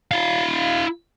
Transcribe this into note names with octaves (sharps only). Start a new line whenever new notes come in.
E4 F5